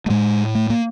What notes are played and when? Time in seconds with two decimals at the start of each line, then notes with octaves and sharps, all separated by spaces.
0.06 A3
0.10 A2 G#3
0.55 A3
0.70 A#3